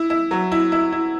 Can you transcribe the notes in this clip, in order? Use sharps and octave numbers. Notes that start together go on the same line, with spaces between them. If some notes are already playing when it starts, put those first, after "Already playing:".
Already playing: E4
E4
F#3
E4
E4
E4